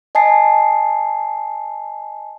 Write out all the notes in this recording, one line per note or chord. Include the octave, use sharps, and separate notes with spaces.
D#5 G#5 A5 C7